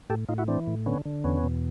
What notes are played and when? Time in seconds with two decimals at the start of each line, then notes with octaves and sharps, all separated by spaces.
0.10 A2 G4 A4
0.29 A2 D#4 F4
0.38 E4 F#4
0.48 E3 C4 D4
0.67 A2
0.86 D3 B3 C#4
1.05 D3
1.24 E2 B3 C#4
1.44 B2